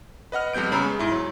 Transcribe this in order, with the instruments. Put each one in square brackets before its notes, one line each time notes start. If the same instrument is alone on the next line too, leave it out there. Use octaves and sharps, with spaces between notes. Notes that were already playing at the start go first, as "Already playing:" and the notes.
[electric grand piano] B4 D#5 F#5 F6
F2 G3 B3 G6 D7
C#3 B3 G#4 A#5 B5 E6
G#3
G#2 E4
F#3